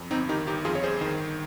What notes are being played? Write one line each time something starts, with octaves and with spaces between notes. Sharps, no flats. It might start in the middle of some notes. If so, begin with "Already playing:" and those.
Already playing: F2
G1 C4 D#4
D#3 D#4 G4
G1 D#4 G4
F2 F4 G#4
C#5
G1 G#4 C5
D#3
G1